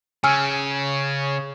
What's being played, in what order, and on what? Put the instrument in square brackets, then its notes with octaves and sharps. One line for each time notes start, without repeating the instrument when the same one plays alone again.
[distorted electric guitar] C#3 [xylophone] G#5 E6 F6